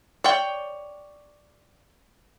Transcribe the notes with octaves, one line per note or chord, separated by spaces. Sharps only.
C#5 D5 G5